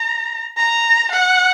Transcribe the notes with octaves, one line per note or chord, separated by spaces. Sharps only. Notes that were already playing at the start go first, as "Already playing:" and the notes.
Already playing: A#5
A#5
F#5